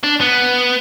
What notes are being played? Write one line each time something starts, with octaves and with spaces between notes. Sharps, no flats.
D4
B3